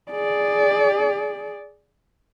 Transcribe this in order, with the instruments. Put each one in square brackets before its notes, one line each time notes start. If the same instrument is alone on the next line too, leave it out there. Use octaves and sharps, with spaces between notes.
[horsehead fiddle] G#4 D5